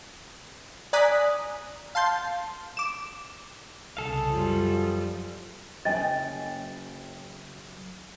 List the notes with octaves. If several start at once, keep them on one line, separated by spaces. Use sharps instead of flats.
D5 G#5 A#5 D#6 F#6 B6
F5 A5 C6 G6
D6 E7
C2 C#3 G#4 A4 F5
F#2 F3 G3
F#2 C#3 D#5 G5 G#5 A6